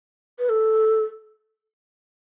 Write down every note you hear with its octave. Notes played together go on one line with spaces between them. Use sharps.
B4
A4